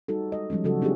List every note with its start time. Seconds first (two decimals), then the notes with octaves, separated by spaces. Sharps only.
0.08 G3 D#4 F#4 A4
0.32 G#3 D#5
0.50 F3 G3 G#3 C#4
0.64 C#3 E3 F#3 C#4 F#4 A4
0.82 C4 D4 D#4 F4 G4 G#4